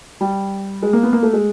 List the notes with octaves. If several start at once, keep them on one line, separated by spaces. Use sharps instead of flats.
G3
G#3
A#3
B3
A#3
A3
G#3